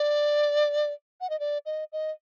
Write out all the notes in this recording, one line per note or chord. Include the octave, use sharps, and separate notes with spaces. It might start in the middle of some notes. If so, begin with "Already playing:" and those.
Already playing: D5
F#5
D#5
D5
D#5
D#5